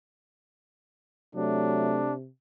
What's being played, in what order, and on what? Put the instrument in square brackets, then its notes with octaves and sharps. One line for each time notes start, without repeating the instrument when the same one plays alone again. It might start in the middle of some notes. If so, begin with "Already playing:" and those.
[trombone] C3 [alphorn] F#3 [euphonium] A3 [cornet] D4